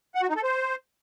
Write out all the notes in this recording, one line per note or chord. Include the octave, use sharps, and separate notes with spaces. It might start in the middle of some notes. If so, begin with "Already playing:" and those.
F#5
F#4
D#4
A4
C5